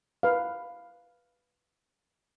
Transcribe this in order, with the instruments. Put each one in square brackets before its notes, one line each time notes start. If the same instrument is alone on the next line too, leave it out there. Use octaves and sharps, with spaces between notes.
[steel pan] B4 F5